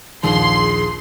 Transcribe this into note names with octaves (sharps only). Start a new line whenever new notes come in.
A#1 D#2 G#4 C6